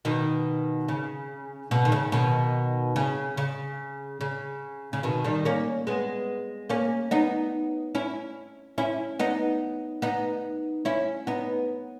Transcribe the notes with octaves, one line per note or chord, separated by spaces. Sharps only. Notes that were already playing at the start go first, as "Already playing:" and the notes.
B2 D#3
C#3
B2
D#3
C#3
B2 D#3
C#3
C#3
C#3
C#3
B2 D#3
D#3 G3
A#3 C#4
G#3 B3
A#3 C#4
B3 D#4
C#4 E4
C#4 E4
B3 D#4
B3 D#4
C#4 E4
B3 D#4